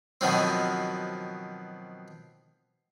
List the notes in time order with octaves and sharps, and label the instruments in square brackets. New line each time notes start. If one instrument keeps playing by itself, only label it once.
[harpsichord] B2 D#3 F3 F#3 C4